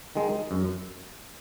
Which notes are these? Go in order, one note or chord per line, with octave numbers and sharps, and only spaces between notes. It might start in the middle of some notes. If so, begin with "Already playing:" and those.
D#3 G#3
F#2